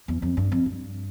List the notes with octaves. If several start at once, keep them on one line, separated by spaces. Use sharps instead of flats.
E2
F2
G2
F2
G2